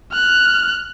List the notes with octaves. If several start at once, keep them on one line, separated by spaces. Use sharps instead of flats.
F6 F#6